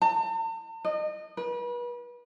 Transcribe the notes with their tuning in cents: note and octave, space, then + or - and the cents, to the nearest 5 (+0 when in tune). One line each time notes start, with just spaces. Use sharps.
A5 +45
D#5 -30
B4 -35